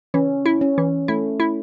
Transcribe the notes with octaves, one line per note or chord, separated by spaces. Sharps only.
E3 C#4
E4
C#4
E3
A3 E4
E4